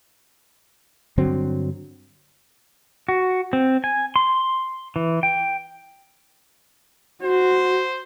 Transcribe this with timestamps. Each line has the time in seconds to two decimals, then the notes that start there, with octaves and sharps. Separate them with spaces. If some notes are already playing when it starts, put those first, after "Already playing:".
1.18 G2 D3 F#3 C4
3.09 F#4
3.53 C4
3.84 G#5
4.16 C6
4.96 E3
5.23 G5
7.23 F#4 C5